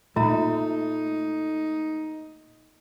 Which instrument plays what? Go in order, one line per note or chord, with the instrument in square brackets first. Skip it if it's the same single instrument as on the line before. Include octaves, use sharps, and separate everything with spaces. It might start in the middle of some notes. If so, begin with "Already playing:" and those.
[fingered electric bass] A#2 [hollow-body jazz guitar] A3 [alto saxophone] D#4 [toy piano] F4 E5 A#5